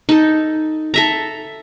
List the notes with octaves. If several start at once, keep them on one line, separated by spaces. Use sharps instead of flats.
D#4 A4
A4 E5 A#5